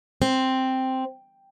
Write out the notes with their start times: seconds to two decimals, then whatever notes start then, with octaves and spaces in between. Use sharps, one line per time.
0.22 C4